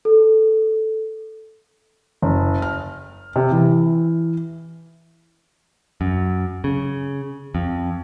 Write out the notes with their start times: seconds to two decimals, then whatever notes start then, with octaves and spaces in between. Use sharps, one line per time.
0.05 A4
2.22 F#1
2.62 F6
3.36 C3
3.51 E3
6.01 F#2
6.64 C#3
7.55 F2